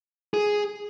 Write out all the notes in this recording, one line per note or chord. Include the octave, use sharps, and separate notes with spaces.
G#4